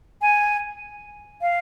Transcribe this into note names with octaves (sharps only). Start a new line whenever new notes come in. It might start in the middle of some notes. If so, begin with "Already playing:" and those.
G#5
F5